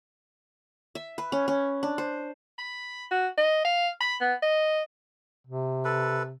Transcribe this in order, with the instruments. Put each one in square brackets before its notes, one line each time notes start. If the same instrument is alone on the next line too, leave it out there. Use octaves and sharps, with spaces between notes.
[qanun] E5
B4
C#4
C#4
D4
C5
[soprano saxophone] B5
F#4
D#5
F5
B5
B3
D#5
[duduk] C3
[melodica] A4 B4